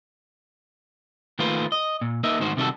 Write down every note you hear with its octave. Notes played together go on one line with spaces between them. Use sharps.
D#3 A3 A#3 F4 B4 C5
D#5
A#2
A#3 D#4 A#4 D#5 E5
D2 G#2 D#3 F#4 C5
C3 D#3 G3 F4 F#4 A4